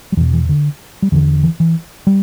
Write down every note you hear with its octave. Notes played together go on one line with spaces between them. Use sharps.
G3
E2 B2 E3
E3
D3
G3
E2 D3 E3
E3
E3
G3